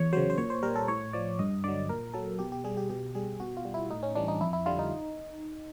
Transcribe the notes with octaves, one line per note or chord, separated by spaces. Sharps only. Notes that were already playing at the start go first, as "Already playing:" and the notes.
Already playing: E2 C#5
C#3 F#3 C5
C5
A#2 C#5
C5
G3 A#4
A4
A2 C#5
F3 D5
G2 D#5
D3 F#3 D5
A#2 A#4
F#3 A4
B2 G4
G4
G3 G#4
G4
B2 G4
G3 G#4
B2 F#4
F4
G3
E4
A2 D#4
C#4
E3 G3 D4
D#4
F2 E4
E4
D3 G3 F4
D#4